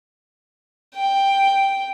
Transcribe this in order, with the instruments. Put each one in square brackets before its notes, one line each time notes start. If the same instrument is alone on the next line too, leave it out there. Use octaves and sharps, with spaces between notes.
[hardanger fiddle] G5